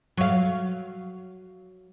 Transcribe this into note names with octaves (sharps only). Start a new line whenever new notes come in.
F#3 F5